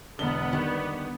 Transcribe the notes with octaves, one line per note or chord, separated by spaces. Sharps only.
E1 D3 B3 G7
D#3 G3